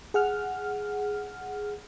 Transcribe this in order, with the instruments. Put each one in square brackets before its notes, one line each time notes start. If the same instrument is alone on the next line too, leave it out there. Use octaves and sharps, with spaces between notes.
[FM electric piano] G#4 F#5 F6